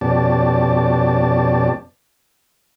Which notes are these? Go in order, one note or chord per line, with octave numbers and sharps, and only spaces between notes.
F2 B2 C#4 G4 D5 A5